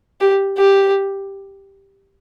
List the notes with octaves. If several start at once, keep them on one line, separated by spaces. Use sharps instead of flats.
G4
G4